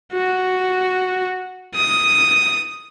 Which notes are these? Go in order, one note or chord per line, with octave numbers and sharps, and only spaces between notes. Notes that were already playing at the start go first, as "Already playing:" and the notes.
F#4
D#6